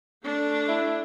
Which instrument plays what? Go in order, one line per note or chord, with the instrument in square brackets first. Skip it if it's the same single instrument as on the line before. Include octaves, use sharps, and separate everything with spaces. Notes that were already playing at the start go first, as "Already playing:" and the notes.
[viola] A3 D4
[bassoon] E4